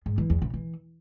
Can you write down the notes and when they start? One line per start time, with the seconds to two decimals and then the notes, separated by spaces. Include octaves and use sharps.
0.06 G#2
0.18 E3
0.30 E2
0.42 C#3
0.54 E3